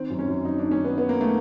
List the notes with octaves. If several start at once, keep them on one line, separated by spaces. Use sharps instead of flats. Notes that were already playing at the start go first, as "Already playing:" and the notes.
Already playing: D#3 C4
F#2
C#4
F#2
F#2 D#4
D#3 D4
C#4
D#3 B3
D#3 B3
A#3
A3